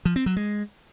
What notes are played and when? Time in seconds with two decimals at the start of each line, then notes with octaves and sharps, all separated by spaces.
0.05 F3
0.16 C4
0.26 F#3
0.37 G#3